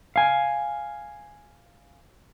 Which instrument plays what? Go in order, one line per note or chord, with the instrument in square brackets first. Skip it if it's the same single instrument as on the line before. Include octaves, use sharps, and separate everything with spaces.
[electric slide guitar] F5 G#5